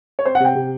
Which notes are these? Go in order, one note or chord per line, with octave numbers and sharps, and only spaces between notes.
C#5
C4 C5
F#5
C3 G5
C3